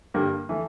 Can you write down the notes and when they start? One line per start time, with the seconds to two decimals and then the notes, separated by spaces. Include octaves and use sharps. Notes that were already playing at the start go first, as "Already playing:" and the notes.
0.14 G2 D3 G3 A#3
0.49 E3 A3